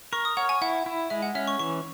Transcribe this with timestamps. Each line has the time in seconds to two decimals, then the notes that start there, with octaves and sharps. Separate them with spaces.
0.13 A#4 C#6
0.25 D#6
0.37 C#5 F#5
0.49 G#5
0.62 E4 F#5
0.86 E4
1.10 G#3 E5
1.22 F#5
1.35 C#4 E5
1.47 C#6
1.59 E3 C#6